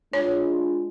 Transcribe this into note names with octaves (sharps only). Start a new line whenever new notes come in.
G#3 D4 F4 C#5